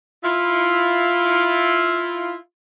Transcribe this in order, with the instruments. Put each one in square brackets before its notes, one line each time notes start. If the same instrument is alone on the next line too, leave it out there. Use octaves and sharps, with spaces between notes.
[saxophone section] E4 F4